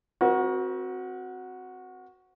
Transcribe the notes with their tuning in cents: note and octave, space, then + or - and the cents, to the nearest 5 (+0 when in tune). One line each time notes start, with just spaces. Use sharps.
C4 +0 F#4 -5 A#4 +40